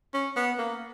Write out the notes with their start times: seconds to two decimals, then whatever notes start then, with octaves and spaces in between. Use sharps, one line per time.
0.14 C#4
0.36 B3
0.59 A#3